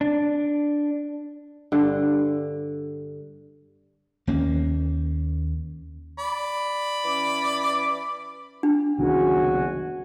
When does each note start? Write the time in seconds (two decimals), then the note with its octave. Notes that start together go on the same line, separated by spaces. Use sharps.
0.01 D4
1.72 G2 D3
4.27 D#2 A#3 C#4
6.18 D5 B5
7.04 E3 C#4 D6
8.63 D4
8.98 F#1 C2 D#3 B3 F#4 G#5